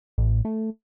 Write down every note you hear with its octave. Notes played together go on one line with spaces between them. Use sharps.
A1
A3